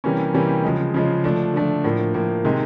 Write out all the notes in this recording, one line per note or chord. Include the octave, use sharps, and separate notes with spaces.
C3 E3 G3 A#3 C#4
C3 E3 G3 A#3 C#4
C#3 F3 G#3
C#3 F3 G#3
D3 F3 A3 D4
D3 F3 A3 D4
A2 F3 A#3
A2 F3 A#3
C3 D#3 G#3